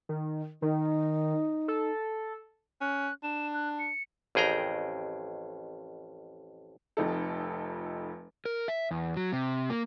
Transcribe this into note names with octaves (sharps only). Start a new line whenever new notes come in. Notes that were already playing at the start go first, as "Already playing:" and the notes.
D#3
D#3 D#4
A4
C#4 F#6
D4 E7
F#6
C#7
A1 F2 G#4 G5 A#5
F1 F2 D#4 A4
A#4
E5
E2
F#3
C3
A#3